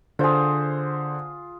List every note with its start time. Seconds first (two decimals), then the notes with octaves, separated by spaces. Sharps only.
0.19 D3 F4 G#4 C5